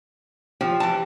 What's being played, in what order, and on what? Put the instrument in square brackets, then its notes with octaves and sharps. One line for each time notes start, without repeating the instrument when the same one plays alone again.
[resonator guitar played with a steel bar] F3 [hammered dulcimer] G4
[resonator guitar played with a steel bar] E3 A5